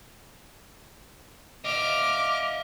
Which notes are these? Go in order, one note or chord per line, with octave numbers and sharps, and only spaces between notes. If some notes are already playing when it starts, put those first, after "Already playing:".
D#5 E5 D6 F6